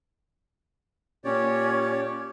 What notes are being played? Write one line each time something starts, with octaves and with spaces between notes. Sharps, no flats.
A#2 C#4 G4 C#5 D5